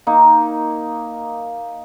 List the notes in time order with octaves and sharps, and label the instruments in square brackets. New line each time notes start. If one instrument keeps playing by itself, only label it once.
[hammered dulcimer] A#3 D#4